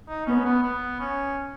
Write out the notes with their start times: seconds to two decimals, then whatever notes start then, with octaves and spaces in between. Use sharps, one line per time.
0.09 D#4
0.26 B3 C#4
0.45 B3
0.63 B3
1.00 C#4